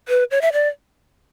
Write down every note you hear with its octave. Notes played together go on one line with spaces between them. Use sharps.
B4
C#5
E5
D5